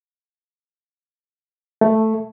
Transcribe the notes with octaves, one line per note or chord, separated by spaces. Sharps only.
A3